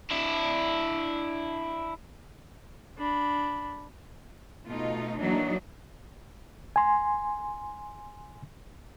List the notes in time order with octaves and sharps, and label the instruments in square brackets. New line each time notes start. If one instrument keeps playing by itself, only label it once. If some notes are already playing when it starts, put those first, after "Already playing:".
[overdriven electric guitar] D4 E4
[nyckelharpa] D4 B5
[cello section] B2 A3 D#4 F4
E3 F#3 A#3 D4 D#4
[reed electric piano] G#5 C6